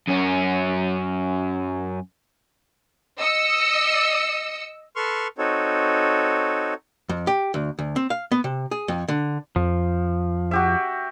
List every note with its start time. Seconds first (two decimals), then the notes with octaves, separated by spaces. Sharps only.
0.08 F#2 C#4
3.19 D#5 E6 C#7
4.95 A4 B4 C6 C#6 F6
5.38 C4 D#4 F#4 A4 C#5
7.09 F2
7.27 G4
7.54 D2
7.79 D2
7.96 C4
8.10 F5
8.32 B3
8.44 C3
8.71 G#4
8.88 F2
9.08 D3
9.56 F2 F3
10.51 F#4 G4 E5